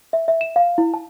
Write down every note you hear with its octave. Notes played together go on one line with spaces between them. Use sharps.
E5
E5
E7
F5
E4
A5